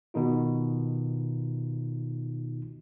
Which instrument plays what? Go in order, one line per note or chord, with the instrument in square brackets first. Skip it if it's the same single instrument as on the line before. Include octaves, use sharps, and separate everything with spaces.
[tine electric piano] B2 D#3 D#4 F4